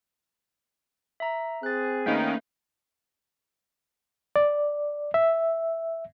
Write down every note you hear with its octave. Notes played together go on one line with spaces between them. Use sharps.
E5 A#5
C4 G#4 F#6 A6
D#3 A3 A#3 C#4 D#4 B4 F5
D5
E5